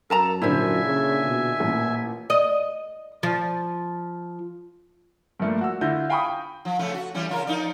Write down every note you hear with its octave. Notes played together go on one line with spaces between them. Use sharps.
F#2 A4 A#4 A5 A#5
A#2 D3 E4 C5 E5 G#5
C#3
B2
A1 A#2
D#5
F3
G2 F3 A3 A#3
F#4 E6
D3 E4 F4 G6 A#6
F5 G5 G#5 B5 C#6 D#6
G5
F3
C#3 F3 A3
F#4
E3 G3 C#4
C#3 F4 A#4
F3 D#4 D5